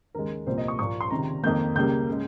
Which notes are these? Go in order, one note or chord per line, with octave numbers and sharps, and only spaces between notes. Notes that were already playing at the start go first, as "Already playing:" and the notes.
D#2 C#3 G#3 A#4
C2 A#2 F3 A#3 C5
D#5
C#6
A#2 F3 A#3 C#6
C6
C#2 C3 D#3 A#5
F2 D#3 A#3 G6
C#2 C#3 G3 A#3 G6
C#3 G#3